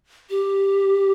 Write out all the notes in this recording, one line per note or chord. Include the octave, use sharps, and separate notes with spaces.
G4